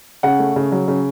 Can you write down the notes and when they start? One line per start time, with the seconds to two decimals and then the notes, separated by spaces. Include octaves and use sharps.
0.23 C#3 F#5
0.39 A3
0.56 C#3
0.72 F#3
0.88 C#3